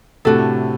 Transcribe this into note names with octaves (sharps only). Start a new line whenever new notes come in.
A2 C3 D4 F#4 A4